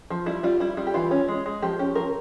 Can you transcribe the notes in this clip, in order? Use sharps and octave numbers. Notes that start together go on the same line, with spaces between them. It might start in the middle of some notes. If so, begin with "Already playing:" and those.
F3
G3 E4
G3 F4
G3 E4
G3 F4
G4
E3 F4
C#4
G#3
G#3
F3 G4
C#4 G4
F3 A#4